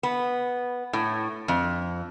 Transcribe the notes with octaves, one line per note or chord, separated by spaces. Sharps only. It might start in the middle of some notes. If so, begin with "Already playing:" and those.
B3
A2
F2